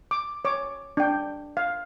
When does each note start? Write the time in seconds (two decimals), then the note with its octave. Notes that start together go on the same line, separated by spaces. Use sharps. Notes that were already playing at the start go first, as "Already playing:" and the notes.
0.11 D6
0.45 C#5 D6
0.97 D4 G5
1.57 F5